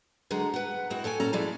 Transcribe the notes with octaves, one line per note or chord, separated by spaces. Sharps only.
D3 F#3 G#3 F#5 A#5
B4 F#5
G#3 C4 E4 F#4
A4 C#5 G5 G#5
A#2 C#4 A4 A#5
F3 G#3 A3 E4 D5